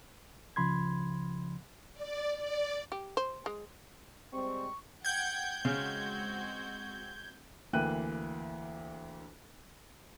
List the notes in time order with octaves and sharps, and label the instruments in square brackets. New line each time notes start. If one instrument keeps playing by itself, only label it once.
[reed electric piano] C#2 C#3 F3 B5 C6 G#6
[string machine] D5
D5
[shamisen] G4
C5
G#3
[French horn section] G3 G#3 C4 [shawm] C#6
[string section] F#5 G5 [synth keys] G6 G#6
[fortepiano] C#3 [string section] G#3 C4 F#4
[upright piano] D2 E3 A#3 G5 F#6 D#7